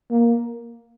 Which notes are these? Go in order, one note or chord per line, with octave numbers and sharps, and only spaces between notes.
A#3